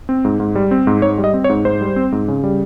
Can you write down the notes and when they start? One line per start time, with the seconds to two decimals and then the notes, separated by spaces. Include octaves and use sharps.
0.09 C4
0.25 G#2
0.40 G#2
0.55 G3
0.71 C4
0.87 G#2
1.02 G#2 C#5
1.18 G3
1.24 D#5
1.34 C4
1.44 C#5
1.50 G#2
1.65 G#2 C5
1.81 G3
1.96 C4
2.12 G#2
2.28 C#3
2.44 G3